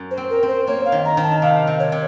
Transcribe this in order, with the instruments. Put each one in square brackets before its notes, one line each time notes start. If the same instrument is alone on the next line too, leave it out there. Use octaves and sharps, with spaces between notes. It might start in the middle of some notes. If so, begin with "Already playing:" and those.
Already playing: [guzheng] F#2
[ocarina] C5
[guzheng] C4
[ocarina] A#4
[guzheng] C4
[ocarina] C5
[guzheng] A#3 [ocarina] C#5
[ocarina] F5
[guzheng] D#3
[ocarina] A#5
[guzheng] D#3
[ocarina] A5
[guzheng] C3 [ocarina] F5
[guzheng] C3
[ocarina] C#5
[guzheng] C3